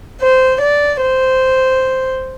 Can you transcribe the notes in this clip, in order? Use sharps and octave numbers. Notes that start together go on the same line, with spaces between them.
C5
D5
C5